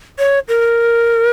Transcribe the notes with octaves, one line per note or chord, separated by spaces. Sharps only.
C#5
A#4